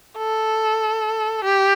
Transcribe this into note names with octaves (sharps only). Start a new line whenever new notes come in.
A4
G4